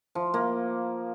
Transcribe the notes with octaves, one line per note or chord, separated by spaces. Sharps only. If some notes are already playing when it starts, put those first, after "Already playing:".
F3
A#3